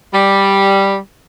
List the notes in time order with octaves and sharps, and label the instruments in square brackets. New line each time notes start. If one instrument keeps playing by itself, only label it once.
[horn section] G3